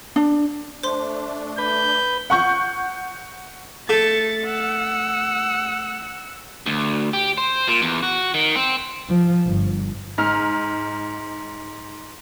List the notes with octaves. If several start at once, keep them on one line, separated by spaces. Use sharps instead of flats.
D4
A3 D4 C5 C6
B4 G6
F#5 C#6 G6
A3 A6 C#7
F#5 E6
D2
G4
C5
A#2
E2
F#4
D#3
C4
F3
G1
G#2 F6